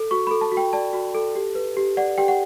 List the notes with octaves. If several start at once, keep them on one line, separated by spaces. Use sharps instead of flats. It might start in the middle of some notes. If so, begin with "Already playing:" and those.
Already playing: A4
F#4 C#6
A4 B5
A5
F#4
G5
D5 A5
F#4
A4
G4
B4
G4
D5 F#5
G4 G5
F#5